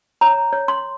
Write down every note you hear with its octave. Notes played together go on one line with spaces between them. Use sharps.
C#5 A#5
C#5
C6